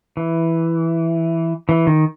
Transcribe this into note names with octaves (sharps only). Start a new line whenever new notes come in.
E3
E3
D#3